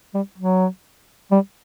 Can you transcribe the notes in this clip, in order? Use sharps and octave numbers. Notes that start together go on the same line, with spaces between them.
G3
F#3
G3